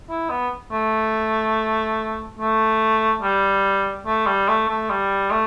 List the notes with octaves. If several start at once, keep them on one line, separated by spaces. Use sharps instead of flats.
E4
B3
A3
A3
G3
A3
G3
A3
A3
G3
A3